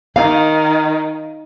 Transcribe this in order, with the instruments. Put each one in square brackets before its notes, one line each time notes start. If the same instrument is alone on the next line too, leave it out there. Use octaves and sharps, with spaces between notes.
[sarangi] D#3 [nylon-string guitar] F5